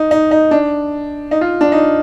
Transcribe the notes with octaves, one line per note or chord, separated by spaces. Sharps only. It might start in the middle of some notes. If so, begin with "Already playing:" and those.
Already playing: D#4
D#4
D#4
D4
D#4
F4
D4
D#4